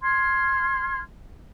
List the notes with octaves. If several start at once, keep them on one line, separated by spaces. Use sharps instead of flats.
C6 F6 G#6